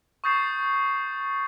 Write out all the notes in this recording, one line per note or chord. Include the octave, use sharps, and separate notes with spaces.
C#6 D#6 G6 A6 C7 E7